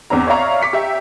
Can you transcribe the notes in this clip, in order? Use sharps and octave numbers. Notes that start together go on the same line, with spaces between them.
E2 C4 D4 A#5
C#5 D5 E5 F5 A#5 C#6
D6 B6 C#7
G4 E5